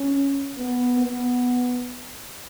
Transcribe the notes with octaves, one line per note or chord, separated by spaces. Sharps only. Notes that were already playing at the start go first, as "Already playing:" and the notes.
Already playing: C#4
B3
B3